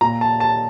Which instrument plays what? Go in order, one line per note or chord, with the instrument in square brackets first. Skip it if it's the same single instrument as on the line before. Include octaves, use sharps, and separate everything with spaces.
[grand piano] A#2 A#5
A5
A5